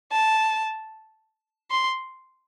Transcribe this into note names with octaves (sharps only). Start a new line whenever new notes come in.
A5
C6